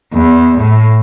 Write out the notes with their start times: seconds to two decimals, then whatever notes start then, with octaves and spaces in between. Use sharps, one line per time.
0.13 E2
0.58 A2